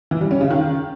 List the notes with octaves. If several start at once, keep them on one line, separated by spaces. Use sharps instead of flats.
E3
G3
C#4
C#3
D#3